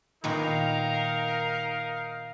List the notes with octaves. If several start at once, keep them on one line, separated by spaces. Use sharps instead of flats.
A#2 D#3 B3 D#4 A#4 F5